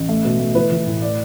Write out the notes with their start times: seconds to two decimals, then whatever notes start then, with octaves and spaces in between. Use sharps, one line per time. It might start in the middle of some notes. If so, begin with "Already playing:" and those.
Already playing: A1
0.09 A3
0.25 B2
0.39 A3
0.55 E3 B4
0.72 E3
0.87 A2
1.02 D5